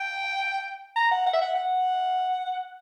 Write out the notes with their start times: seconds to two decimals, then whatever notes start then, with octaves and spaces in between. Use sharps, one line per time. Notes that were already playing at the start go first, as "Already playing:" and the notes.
Already playing: G5
0.96 A#5
1.11 F#5
1.26 F#5
1.33 E5
1.41 F#5
1.55 F#5